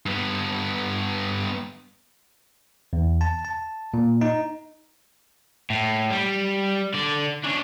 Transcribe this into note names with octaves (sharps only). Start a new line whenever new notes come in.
G2 B3
E2
A5
A5
A#2
D#4
A2
G3
D3 D5
C#4 D4